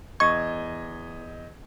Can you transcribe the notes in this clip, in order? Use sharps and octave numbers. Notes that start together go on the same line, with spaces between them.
E2 D#5 C#6 G#6